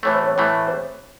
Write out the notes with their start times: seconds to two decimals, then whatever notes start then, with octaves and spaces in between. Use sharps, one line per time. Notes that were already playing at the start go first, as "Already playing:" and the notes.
0.03 A2 E3 A3 C#5
0.14 C5
0.24 C#5
0.38 A2 E3 A3
0.67 C5